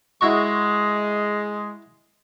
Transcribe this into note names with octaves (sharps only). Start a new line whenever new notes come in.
G#3 E4 F#4 C#6